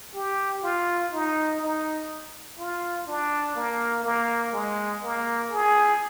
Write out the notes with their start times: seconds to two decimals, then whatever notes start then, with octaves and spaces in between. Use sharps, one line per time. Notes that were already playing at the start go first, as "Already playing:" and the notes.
0.15 G4
0.63 F4
1.13 D#4
1.61 D#4
2.58 F4
3.07 D4
3.56 A#3
4.04 A#3
4.53 G#3
5.02 A#3
5.51 G#4